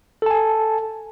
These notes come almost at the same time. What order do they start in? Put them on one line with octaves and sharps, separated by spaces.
A4 A5 G#5